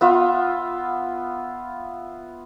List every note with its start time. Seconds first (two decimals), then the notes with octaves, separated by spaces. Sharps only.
0.01 B3 F4 E5